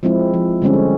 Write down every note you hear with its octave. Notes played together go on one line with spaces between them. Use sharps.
F3 G#3 C4 E4
F3
D3 G3 G#3 C4 C#4
A4